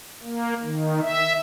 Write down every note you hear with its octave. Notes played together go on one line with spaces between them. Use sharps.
A#3
D#3
E5